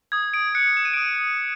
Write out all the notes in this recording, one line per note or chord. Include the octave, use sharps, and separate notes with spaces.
D#6 G#6
D7
F#6 C#7
E7
D#7
D7
D#6 D#7